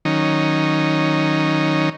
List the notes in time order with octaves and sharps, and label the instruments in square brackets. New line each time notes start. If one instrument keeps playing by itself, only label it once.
[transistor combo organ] D#3 F#3 C#4 D#4